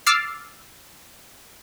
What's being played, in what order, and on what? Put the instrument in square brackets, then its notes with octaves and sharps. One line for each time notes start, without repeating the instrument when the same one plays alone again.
[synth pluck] D6 E6 F6 A6 C7